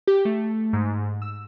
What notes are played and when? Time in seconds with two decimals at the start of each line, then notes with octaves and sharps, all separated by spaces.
0.07 G4
0.25 A3
0.73 G#2
1.22 E6